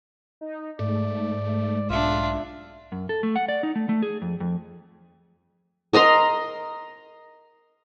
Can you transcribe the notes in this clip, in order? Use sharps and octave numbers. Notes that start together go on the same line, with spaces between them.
D#4
G#2 A3 D5
B1 D4 F4 E5
F#2
A4
A3
F#5
D5
D#4
A3
A3
G#4
F2
F2
A#4 D#5 A#5 C6